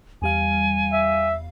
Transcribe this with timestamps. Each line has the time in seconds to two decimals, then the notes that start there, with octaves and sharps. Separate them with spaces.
0.22 E2 G3 F5 G#5
0.93 E5